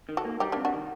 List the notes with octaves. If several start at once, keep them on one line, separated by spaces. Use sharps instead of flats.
D#3
F#4 A4
A#3
G3 D#4 G4
C3 A#3 D4
D4 F#4
D#3